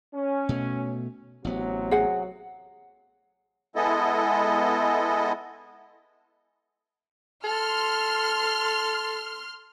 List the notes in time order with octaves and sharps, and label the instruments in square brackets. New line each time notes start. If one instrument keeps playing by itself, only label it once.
[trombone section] C#4
[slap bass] B2 A3
[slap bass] A1 B3 [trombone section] C3 F#3
[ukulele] G#4 F#5
[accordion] G#3 B3 E4 A4 D#5
[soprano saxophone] A4 [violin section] C6 F6